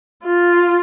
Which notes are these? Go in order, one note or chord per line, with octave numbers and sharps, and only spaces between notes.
F4